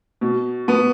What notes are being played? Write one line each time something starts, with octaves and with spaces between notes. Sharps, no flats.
B2
B3